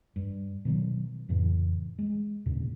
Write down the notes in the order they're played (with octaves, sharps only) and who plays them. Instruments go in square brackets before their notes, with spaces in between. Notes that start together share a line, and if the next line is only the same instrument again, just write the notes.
[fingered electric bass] G2
B2 D#3 E3 F#3
F2 A2 C#3 E3
G#3
D#2 A#2 C#3